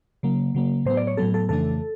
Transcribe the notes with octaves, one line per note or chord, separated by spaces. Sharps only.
C#3 F#3 A#3
C#3 F#3 A#3
A2 F#3 B3 C5
D5
C#5
A2 F#3 B3 A4
A4
F2 C#3 E3 A3 D4 A4